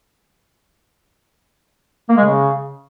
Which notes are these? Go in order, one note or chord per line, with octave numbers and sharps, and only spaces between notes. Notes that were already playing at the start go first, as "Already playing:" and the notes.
A#3
G#3
C#3